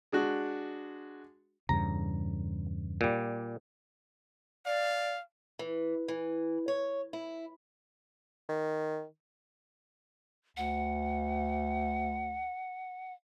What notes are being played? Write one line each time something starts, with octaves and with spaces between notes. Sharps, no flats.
G#3 D4 F#4
E2 G2 C#3 A#5
A#2 G3
D5 F5
E3
E3
C#5
E4
D#3
D2 F#5